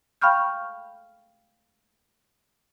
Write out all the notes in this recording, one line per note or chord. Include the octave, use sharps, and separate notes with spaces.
F5 G5 B5 C#6 F6 G6